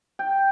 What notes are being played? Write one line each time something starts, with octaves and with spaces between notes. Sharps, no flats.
G5